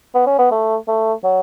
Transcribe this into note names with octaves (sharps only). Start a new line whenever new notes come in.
B3
C#4
B3
A3
A3
F#3